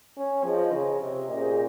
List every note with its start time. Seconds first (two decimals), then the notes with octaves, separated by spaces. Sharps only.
0.17 C#4
0.44 F3 C#4 G#4 C5 D#5
0.72 C#3
1.01 C3
1.28 A#2 C#4 G#4 C5 D#5